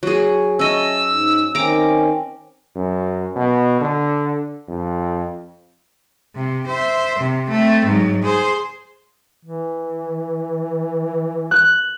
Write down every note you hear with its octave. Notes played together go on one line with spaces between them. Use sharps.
F#3 G#4
C#4 D#5 E5 A5 E6
G#2
D#3 C4 C#4 A#5 D6
F#2
B2
D3
F2
C3
C5 E5
C3
A3 C4
G#2 F#3
G#4 C5
E3
F#6